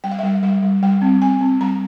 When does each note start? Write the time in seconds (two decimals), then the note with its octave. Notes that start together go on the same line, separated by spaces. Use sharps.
0.04 G3 G5
0.11 F5
0.19 E5
0.23 G3 F5
0.43 G3 F5
0.63 G3
0.83 G3 G5
1.02 C4
1.21 C4 G#5
1.41 C4
1.61 G3 A#5